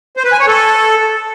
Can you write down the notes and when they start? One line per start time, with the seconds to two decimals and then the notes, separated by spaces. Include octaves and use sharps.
0.17 C5
0.24 B4
0.32 G#5
0.40 C#5
0.47 A4